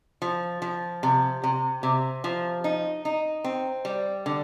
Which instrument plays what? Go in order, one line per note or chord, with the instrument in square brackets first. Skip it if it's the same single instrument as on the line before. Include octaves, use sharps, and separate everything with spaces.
[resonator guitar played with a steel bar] F3
F3
C3
C3
C3
F3
D#4
D#4
C4
G3
D3